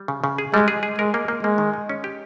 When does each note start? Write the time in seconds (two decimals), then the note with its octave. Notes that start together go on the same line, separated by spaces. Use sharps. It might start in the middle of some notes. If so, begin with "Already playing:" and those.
Already playing: G3
0.08 C#3
0.24 C#3
0.38 G#4
0.53 G3 G#3
0.68 G#4
0.83 G#4
0.98 G#3 A#4
1.14 A#3
1.28 A#3
1.43 G#3 A#3
1.58 D#3
1.73 D#4
1.89 C#4
2.04 G4